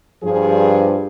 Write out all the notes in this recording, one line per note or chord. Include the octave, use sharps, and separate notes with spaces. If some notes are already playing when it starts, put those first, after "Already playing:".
G2 F3 G#4